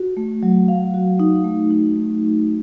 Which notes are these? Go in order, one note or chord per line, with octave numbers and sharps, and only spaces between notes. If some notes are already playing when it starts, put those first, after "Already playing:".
Already playing: F#4
A3
F#3
F5
F#4
D#4
A3
D#4
A3